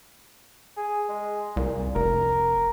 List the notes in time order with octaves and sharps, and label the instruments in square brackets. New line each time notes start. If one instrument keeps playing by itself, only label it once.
[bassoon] G#4
G#3
[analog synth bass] C2 [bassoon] A#2
[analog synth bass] F1 [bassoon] A#4